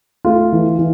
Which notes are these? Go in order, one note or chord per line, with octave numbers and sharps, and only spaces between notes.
A3 F4
E3
E3